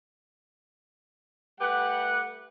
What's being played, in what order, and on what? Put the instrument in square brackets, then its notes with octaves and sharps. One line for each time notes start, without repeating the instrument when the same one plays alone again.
[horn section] G3 A3 G4 B4 F#5